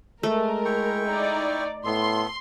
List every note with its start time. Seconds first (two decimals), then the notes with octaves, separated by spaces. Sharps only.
0.23 G#3 A3 A#4
0.65 E4 G5 C#6
1.08 D#4 D5
1.86 A2 B3 A4 C6